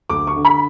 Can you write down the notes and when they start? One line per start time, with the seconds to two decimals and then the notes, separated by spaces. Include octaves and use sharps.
0.09 D2 D6
0.27 C#6
0.36 D3
0.45 B5